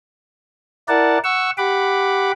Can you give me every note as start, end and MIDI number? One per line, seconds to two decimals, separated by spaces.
0.88 1.18 64
0.88 1.18 70
0.88 1.18 74
0.88 1.18 78
0.88 1.18 81
1.24 1.51 78
1.24 1.51 85
1.24 1.51 88
1.58 2.32 67
1.58 2.32 78
1.58 2.32 83
1.58 2.32 86